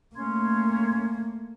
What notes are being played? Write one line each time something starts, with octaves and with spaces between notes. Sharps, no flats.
A3 A#3 C#4 C6 G#6